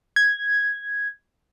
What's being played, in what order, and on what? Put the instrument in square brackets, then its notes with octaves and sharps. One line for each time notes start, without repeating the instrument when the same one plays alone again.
[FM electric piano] G#6